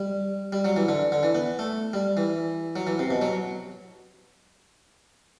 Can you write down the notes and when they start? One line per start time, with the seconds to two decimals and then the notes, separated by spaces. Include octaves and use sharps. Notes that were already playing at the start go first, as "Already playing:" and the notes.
Already playing: G3
0.53 G3
0.65 F#3
0.76 E3
0.88 D3
1.12 D3
1.23 E3
1.35 B3
1.59 A3
1.93 G3
2.17 E3
2.76 F#3
2.87 E3
2.99 C3
3.11 B2
3.22 F#3